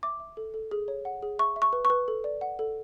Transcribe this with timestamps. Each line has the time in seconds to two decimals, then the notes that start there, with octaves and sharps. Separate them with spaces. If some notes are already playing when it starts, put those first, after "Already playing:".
0.03 E5 D6
0.20 E5
0.37 A4
0.54 A4
0.71 G#4
0.88 C#5
1.05 F#5
1.22 G#4
1.39 E5 C#6
1.56 E5
1.62 C#6
1.73 B4
1.85 C#6
1.90 B4
2.08 A4
2.24 D5
2.41 F#5
2.59 A4